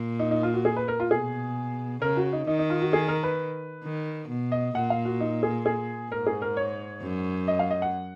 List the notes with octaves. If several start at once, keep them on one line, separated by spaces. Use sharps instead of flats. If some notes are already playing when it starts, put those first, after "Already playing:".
Already playing: A#2
D#4
D#4
F4
F#4
G#4
B4
A#4
F4
B2 G#4
C#3 A#4
F#4
D#4
D#3 D#4
D#4
F4
F#4
G#4
A#4
B4
D#3
B2
D#5
A#2 F#5
F5
F#4
D#4
G#4
G#4
G#2 A#4
G#4
A#4
C#5
F#2
D#5
F5
D#5
F#5